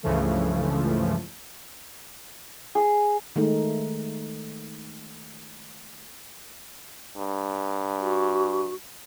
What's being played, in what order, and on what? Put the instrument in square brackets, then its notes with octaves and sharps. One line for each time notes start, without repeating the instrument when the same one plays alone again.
[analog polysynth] C#2 G2 C#3 E3 F3 A3
[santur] G#4
[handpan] D#3 G#3 A3 D#4
[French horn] G2
[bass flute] F#4